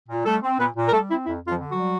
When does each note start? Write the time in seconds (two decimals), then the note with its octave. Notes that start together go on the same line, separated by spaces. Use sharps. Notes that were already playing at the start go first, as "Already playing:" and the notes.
0.09 A#2
0.25 G3 A3 A4
0.43 C4
0.59 A#2 B3 B4
0.75 A#2
0.87 A#4
0.92 G3 A3 A4
1.09 C4 E4
1.25 F2 E4
1.42 F2
1.48 F3 F4
1.59 D3
1.70 F#3 F#4
1.76 G3